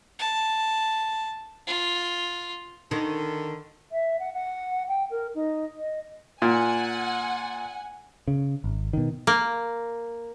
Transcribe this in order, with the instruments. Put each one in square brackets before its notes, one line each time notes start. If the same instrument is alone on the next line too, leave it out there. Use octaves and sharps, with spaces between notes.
[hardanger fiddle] A5
F4
[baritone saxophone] D3 [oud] D#3
[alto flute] E5
F#5
F#5
G5
A#4
D#4
D#5
[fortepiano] A#2 [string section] F#5 G#5
[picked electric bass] C#3
G#1
B2 D#3
[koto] A#3